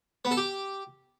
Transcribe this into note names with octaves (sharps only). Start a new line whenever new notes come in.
B3
A4
G4